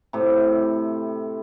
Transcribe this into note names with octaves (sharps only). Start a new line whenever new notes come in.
A2 C3